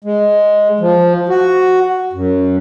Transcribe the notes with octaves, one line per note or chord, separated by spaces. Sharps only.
G#3
F3
F#4
F#2